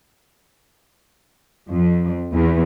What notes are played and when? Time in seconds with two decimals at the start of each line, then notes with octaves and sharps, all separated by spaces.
1.69 F2
2.33 E2